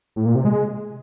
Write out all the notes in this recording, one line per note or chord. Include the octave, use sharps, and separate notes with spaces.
A2
A#2
C3
G#3